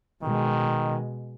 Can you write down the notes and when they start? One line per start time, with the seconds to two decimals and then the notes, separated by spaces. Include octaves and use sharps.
0.23 B2 D#3 G#3